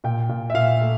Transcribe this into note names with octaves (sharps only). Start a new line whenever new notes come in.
A#2 G5
A#2
E5
A#2 F5
A3